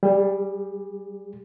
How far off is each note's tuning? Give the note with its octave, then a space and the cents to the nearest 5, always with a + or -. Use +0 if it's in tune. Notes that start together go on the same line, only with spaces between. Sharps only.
G3 +0 G#4 -35